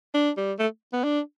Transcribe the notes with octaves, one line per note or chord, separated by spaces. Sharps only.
D4
G3
A3
B3
D4